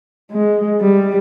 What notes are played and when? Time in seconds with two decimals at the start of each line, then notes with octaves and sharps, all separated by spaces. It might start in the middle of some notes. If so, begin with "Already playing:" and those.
0.31 G#3
0.81 G3